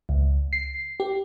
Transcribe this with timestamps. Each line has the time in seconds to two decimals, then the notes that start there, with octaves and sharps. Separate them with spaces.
0.09 C#2
0.53 C7
1.00 G4